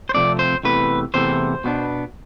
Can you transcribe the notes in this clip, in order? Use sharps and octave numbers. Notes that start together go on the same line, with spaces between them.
C5
C3 F3 A3 C4 D5
C5
E2 C3 E3 A3 B4
E2 C3 E3 A3 C5
B2 B3 D4